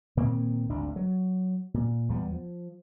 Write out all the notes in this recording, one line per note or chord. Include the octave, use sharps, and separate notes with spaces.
A#2 D#3 A#3 C4
G#1 D2 D4
F#3
A#2
E2 G3 B3
F3